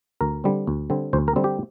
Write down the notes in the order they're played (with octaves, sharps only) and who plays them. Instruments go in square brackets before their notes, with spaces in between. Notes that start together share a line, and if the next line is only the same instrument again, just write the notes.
[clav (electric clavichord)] D2 A#4
D3 G3 C4
D2
D3 G3 C4
D2 C5
A#4
D3 G3 C4
G4